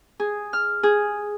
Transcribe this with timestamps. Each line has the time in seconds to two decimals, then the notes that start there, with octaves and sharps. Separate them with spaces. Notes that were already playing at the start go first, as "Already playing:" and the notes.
0.20 G#4
0.53 F6
0.83 G#4